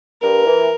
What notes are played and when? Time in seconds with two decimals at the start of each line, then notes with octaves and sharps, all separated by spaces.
0.22 G2 A#4
0.46 E3